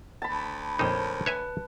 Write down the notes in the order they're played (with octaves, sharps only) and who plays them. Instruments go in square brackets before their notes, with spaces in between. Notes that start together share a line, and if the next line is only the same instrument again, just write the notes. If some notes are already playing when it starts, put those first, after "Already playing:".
[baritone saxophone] D2 [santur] A5 B5
[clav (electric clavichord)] F2 A#2 D#4 [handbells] A#4 C5 C#5
[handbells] B4 [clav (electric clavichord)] C#5 E5 G#5